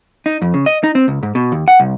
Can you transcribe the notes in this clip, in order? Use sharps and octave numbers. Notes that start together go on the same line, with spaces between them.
D#4
F2
C#3
D#5
D#4
C4
C#2
G#2
B2
D#2
F#5
C2